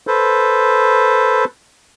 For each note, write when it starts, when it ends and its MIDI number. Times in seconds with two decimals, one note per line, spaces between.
0.07 1.45 69
0.07 1.45 71
0.07 1.45 72